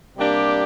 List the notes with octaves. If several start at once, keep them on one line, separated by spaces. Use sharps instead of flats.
C3 G3 A#3 D4 G4